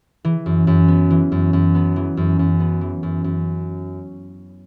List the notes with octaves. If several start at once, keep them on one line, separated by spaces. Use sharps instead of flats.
E3
F#2
F#2
B3
E3
F#2
F#2
B3
E3
F#2
F#2
B3
E3
F#2
F#2